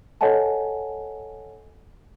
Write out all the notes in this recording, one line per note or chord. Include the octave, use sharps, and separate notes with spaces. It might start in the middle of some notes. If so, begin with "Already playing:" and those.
A4 C#5 D#5 F#5 G#5 A5